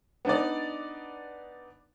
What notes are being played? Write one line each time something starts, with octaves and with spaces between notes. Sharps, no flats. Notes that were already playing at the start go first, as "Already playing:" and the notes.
B3 D4 D#4 D5